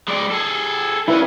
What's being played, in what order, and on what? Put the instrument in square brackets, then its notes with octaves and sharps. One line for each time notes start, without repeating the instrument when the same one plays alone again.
[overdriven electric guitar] G#3 D5
G#4 A4
[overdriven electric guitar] G2 C#4 [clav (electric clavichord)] E4 B4